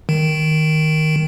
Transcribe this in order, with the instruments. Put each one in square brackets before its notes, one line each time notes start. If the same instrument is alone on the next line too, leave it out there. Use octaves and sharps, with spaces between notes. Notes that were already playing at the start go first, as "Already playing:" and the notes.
[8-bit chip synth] D#3